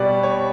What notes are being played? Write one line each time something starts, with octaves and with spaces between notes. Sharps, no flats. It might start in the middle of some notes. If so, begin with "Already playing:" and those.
Already playing: B2 G3 D5
C#5